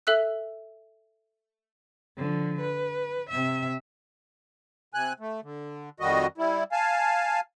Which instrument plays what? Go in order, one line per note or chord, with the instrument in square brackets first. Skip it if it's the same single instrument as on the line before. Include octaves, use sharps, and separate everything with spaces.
[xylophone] A4 E5 E6 F#6
[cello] D3 F3
B4
C3 E5
[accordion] C3 G#5 F#6
A3
D3
F2 D#3 G3 F#4 D#5
G3 E4
F5 G#5 A5